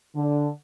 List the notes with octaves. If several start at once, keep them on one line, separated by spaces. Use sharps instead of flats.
D3